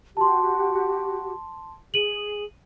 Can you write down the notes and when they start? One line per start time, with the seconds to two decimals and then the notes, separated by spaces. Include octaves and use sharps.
0.17 F#4 G4 A5 C6
1.94 G#4 D#7 F#7